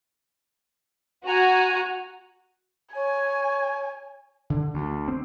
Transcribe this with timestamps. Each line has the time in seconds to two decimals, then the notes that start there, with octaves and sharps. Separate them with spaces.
1.26 F#4 G#5 A#5
2.95 C#5 G#5
4.50 D3
4.74 D2
5.08 C4